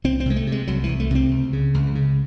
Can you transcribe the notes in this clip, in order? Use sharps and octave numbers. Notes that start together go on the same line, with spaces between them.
C2 C4
C4
C3 G#3
A3
C3
G#3
C2 F#3
E3
C2
A3
C3 C4
C#2
C#3
C#2
C#3